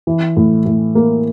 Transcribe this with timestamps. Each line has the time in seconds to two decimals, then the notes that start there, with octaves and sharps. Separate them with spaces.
0.07 E3
0.37 A2
0.66 A2
0.95 A#3